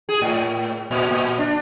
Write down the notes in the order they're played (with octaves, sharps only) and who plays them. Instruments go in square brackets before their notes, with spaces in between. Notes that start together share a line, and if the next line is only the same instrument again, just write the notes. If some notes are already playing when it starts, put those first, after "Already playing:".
[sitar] G#4
A2
A#2
A#2
D4